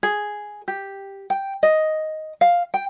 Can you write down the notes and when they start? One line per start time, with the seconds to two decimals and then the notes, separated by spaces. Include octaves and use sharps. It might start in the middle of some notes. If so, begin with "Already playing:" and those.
0.03 G#4
0.68 G4
1.30 G5
1.63 D#5
2.41 F5
2.74 G5